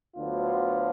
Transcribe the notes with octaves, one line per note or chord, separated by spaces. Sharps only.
D2 D3 F#3 B3 F4